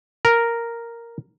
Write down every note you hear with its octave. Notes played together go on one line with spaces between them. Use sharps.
A#4